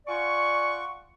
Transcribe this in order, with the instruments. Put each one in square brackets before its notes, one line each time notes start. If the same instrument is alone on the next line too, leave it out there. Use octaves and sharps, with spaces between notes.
[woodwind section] F4 D5 F#5 G#5 C#6